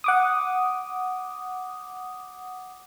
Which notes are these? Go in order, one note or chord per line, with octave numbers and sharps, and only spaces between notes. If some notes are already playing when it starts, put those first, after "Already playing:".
F#5 D6 D#6